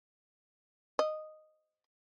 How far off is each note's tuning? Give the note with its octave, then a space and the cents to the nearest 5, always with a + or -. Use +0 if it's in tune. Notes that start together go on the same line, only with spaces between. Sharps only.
D#5 -5